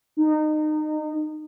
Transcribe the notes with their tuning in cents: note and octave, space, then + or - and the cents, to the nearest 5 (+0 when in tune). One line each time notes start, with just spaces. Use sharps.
D#4 -25